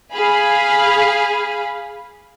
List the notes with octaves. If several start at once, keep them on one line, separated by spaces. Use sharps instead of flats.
G#4 F5 G#5 B5